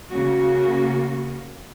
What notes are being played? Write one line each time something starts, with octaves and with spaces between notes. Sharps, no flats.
C#3 A#3 F#4